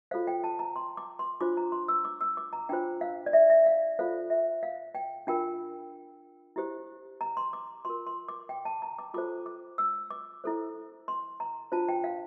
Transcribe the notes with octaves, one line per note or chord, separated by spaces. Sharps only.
F4 A4 C5 F5
G5
A5
A#5
C6
D6
C6
D4 F4 C5 D6
A#5
C6
E6
D6
E6
D6
A#5
D4 F4 C5 G5
F5
D5
E5
E5
F5
F4 A4 C5 F5
E5
F5
G5
D4 F4 A#4 G5
E4 G4 C5
A#5
C6
D6
F4 A#4 C6
C6
D6
G5
A5
A#5
D6
F4 A4 C5 D6
D6
E6
D6
E4 A4 C5
C6
A#5
D4 F4 C5 A5
G5
F5